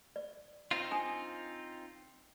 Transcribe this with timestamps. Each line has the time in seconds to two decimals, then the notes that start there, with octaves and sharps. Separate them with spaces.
0.16 D5
0.71 C4 D#4 F4
0.91 D4 G#5 D#6